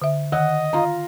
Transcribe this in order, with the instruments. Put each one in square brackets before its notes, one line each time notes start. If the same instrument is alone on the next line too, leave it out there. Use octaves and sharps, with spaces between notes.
[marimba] D3 E5
[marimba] D#3 [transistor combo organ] D#5 [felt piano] F#5
[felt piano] F4 A#5